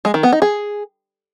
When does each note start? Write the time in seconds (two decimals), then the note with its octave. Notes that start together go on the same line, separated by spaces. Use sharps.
0.05 G#3
0.14 D#3
0.23 B3
0.32 D#4
0.42 G#4